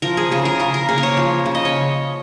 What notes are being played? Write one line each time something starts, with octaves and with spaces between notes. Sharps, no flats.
F3 A#4
G#4
C#3 G#4
A#4
C#3 A#4
A#4
A#3 G#4
A#4
C#5
F3
C#3
D#5
C#5